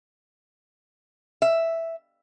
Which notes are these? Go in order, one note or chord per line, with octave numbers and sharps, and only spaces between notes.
E5